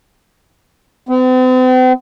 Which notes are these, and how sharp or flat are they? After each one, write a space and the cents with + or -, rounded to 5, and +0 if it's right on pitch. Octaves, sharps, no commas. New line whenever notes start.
C4 -45